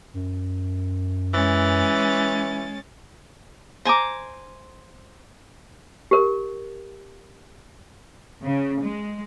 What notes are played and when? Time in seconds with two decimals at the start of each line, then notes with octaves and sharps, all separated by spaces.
0.14 F#2
1.34 E3 G#3 C#4 A6
3.85 C5 G#5 A#5 D6
6.11 G4 A#4
8.43 C#3
8.82 G#3